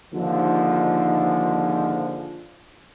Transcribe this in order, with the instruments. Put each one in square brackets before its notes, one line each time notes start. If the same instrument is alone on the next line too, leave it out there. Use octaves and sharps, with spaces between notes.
[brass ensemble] D#2 G#2 D3 F3